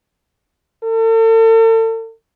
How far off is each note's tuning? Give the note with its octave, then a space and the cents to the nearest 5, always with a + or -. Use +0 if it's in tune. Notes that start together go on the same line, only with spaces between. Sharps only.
A4 +40